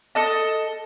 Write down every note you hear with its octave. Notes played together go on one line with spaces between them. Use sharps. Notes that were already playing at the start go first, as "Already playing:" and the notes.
A4 D#5 A5